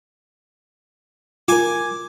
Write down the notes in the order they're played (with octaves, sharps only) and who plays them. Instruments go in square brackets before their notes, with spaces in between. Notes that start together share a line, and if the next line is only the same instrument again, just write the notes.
[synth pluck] F4 A#4 [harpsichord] G#5 D6